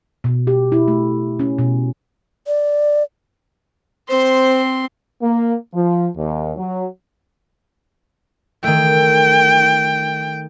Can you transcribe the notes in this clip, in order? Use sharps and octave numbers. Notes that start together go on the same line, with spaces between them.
B2
G4
E4
A3
C#4
B2
D5
C4 C5 C6
A#3
F3
D#2
F#3
D#3 A3 G5